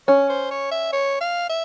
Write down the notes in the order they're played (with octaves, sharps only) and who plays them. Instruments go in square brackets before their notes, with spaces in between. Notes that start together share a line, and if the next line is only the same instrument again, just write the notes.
[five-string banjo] C#4 [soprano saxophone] C#5
[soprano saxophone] C5
C#5
E5
C#5
F5
E5